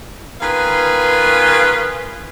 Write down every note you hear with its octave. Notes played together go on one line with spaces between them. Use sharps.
D#3 B3 F4 G#4 B4 F5